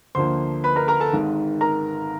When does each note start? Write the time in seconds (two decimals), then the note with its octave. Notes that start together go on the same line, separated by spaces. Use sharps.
0.15 D2 D3 F3 A#3 C5 C6
0.64 B4 B5
0.76 A#4 A#5
0.88 A#4 A#5
1.00 A4 A5
1.13 G#1 G#2 D#3
1.61 A#4 A#5